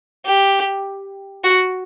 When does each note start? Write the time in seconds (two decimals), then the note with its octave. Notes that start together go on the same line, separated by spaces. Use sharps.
0.25 G4
1.44 F#4